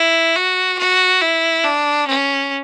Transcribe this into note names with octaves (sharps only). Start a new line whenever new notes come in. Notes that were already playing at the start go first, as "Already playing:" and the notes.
Already playing: E4
F#4
F#4
E4
D4
C#4